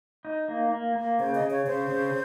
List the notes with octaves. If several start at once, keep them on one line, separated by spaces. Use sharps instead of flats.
D#4
A#3
A#3
A#3
C#3 C5
D#5
C#3
C#5
C#3 C5
C#3